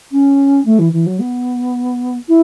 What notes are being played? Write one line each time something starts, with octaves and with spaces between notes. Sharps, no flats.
C#4
A3
E3
E3
F#3
B3
E4